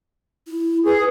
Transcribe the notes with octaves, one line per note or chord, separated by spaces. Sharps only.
E4
G#4 B4